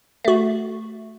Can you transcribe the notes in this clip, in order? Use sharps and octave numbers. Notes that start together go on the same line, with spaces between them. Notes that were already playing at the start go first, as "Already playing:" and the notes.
A3 F#4